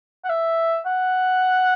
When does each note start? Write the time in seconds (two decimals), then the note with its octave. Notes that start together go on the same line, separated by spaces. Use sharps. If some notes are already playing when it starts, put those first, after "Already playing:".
0.24 F#5
0.29 E5
0.86 F#5